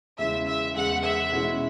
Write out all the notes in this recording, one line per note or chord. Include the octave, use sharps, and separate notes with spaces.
E2 C#3 G#3 C#4 E4 E5
E5
E2 C#3 G#3 F#5
E5
B2 G#3 C#4 E4